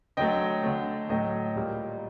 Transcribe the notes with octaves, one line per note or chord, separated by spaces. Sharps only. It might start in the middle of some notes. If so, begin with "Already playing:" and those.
D3 F#3 A3 D#5 G5
D3 A3
A2 F#3 A3 D#5 G5
A#2 G3 A#3